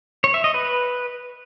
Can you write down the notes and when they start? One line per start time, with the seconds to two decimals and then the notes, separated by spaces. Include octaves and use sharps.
0.24 C#5
0.34 E5
0.44 D#5
0.54 B4